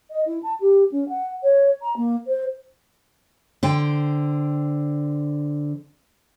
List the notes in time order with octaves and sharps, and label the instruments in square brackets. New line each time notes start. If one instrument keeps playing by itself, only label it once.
[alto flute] D#5
E4
A5
G4
C#4
F#5
C#5
A#5
A#3
C5
[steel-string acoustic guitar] D3 C5 G5